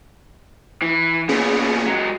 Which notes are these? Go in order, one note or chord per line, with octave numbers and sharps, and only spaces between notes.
E3
A#2 B3 C#4 G#4
F#3 G#3